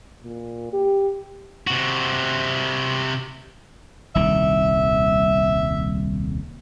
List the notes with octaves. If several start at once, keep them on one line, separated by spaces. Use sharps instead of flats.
A#2
G4
C3 F#4
D#1 C2 D#3 E5